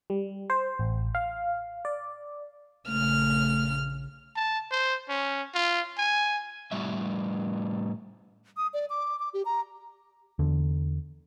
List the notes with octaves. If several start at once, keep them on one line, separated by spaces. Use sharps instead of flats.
G3
C5
A1
F5
D5
A#1 C#3 A3 F6
A5
C5
C#4
F4
G#5
A2 G3 E5
D#6
D5
D6
D6
G4
A#5
E2 D3